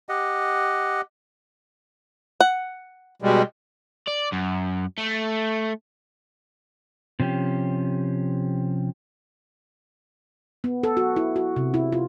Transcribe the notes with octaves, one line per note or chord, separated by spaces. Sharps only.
G4 D#5 F#5
F#5
B2 G3 G#3
D5
F#2
A3
C3 F3 C#4 G4
B3
A4
F#4
E4
F#4
C3
E4
F4